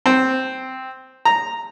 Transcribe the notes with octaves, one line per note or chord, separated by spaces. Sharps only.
C4
A#5